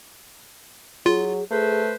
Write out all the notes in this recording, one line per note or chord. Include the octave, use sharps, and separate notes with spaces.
F#3 F4 G#4
A3 G#4 B4 C5